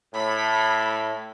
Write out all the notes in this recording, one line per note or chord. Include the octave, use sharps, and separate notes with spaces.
A2 B5